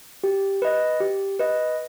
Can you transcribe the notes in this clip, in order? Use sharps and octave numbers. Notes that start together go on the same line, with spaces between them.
G4
B4 D#5
G4
B4 D#5